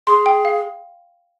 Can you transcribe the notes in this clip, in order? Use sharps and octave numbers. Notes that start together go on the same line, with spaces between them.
G#4 C6
G5
F5